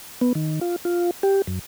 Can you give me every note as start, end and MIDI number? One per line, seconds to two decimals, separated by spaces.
0.21 0.33 59
0.35 0.60 51
0.61 0.76 65
0.85 1.11 65
1.23 1.42 67
1.47 1.59 42